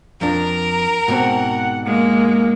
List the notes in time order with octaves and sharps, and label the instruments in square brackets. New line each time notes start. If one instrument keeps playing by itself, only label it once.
[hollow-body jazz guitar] F2 D4 [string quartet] A#4
[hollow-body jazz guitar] G#2 B2 C4 [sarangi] F#5
[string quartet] G#3 [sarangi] A#3